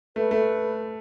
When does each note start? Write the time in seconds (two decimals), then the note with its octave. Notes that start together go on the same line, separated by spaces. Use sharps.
0.16 A3 B4
0.31 A3